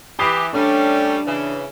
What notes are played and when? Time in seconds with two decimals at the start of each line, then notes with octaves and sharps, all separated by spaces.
0.19 E3 G4 B5 D#6 C7
0.53 G3 A3 C#4 D4
1.25 C#3 E3